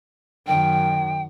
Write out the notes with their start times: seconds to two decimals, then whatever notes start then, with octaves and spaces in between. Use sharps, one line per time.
0.47 F#2 D#3 G5